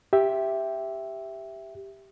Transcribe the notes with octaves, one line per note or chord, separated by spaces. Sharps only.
G4 E5